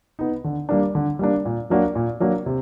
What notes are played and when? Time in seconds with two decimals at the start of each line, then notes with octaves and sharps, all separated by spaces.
0.19 B3 D#4
0.44 D3
0.69 G3 A#3 D4
0.95 D3
1.19 G3 A#3 D4
1.45 A#2
1.70 F#3 A#3 D4 F#4
1.95 A#2
2.20 F#3 A#3 D4 F#4
2.46 C3